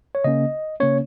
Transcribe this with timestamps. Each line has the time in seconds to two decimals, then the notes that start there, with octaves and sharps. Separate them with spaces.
0.15 C#5
0.24 C#3 A#3 C#4 D#5
0.80 C#3 A#3 C#4 C#5